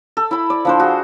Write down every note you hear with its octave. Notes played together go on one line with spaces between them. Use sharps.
A4
E4 B5
D5
F3 D4 C5
F#4 G#4